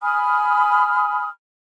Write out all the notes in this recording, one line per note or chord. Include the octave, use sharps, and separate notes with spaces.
G#5 B5 D#6 F6